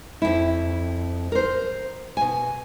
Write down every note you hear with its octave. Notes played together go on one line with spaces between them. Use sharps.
F2 E4
A#4 C5
B2 G#5